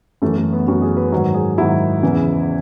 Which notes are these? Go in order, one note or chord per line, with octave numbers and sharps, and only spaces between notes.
F#2 E3 A3
A3
B3
F#2 E3 F#4
G#4
B4
G#2 D#3 F#3
G#4
G#2 D#3 F#3 E4
E2 C#3 E3